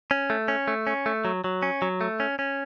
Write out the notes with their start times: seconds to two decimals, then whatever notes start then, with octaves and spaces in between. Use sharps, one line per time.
0.11 C#4
0.30 A3
0.48 C#4
0.68 A3
0.87 C#4
1.06 A3
1.25 F#3
1.44 F#3
1.62 C#4
1.82 F#3
2.01 A3
2.20 C#4
2.39 C#4